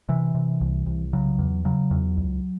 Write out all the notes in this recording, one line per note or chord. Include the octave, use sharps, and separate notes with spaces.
C3 E3
C3
C2
C2
C#3 F#3
E2
C#3 F#3
E2
C#2